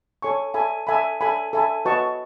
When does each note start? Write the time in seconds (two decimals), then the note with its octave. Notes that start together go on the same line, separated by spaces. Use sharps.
0.22 A4 C#5 G#5 C#6
0.54 A4 E5 G#5 B5
0.87 A4 E5 G#5 B5
1.21 A4 E5 G#5 B5
1.53 A4 E5 G#5 B5
1.85 F#4 B4 D#5 A5 C#6